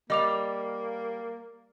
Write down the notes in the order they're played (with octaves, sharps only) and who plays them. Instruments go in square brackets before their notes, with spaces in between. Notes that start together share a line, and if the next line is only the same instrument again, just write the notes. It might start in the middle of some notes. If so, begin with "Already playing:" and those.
[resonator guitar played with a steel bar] G3 [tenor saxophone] A#3 [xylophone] D#5 D6 F7